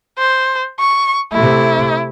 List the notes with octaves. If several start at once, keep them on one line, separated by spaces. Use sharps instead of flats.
C5
C#6
C3 A3 E4